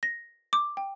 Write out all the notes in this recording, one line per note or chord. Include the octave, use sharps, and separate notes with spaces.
A#6
D6
G5